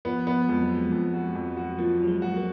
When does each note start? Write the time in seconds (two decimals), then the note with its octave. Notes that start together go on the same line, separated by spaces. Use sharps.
0.05 F3 B3
0.27 B3
0.48 F2 G#3
0.61 F#3
0.70 F3 G#3
0.92 F2
1.14 F#4
1.35 F2
1.57 F#4
1.78 F3 A#3
2.00 F3 F#3
2.07 G#3
2.22 F#4
2.37 A#3